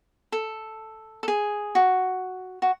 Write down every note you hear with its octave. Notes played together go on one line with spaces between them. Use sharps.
A4
A4
G#4
F#4
F#4